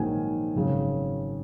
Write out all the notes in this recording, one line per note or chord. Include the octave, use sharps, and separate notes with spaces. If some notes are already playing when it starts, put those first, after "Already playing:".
Already playing: A#1 G#2 D#3 F#3 A#3 G#5
G#1 F#2 C#3 G#3